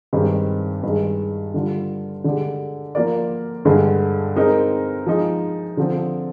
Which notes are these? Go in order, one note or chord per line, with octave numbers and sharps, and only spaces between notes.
G2 D#3 G#3 C4 G4
G2 D#3 G#3
D3 G3 D4 F4
D3 G#3 D4 G4
F3 A#3 F4 A#4 D5
G2 D3 G#3
G#3 C4 D#4 A#4
F3 G#3 D#4
D3 F3 C4